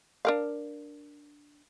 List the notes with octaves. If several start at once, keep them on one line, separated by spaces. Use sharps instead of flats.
D4 A#4 F5